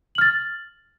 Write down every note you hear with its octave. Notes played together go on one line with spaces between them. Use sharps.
F6 A6 F#7